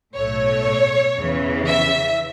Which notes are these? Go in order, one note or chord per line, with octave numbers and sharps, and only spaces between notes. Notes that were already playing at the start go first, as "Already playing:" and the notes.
B1 A2 A3 C#5
E2 C#3 E3
E5